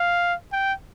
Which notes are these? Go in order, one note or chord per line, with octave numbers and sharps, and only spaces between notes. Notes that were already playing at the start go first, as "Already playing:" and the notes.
Already playing: F5
G5